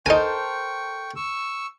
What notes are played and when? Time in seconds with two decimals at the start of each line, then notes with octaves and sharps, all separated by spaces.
0.06 D#4 A4 A#4 C5 G5 G#5 C#6
1.16 C#6 E6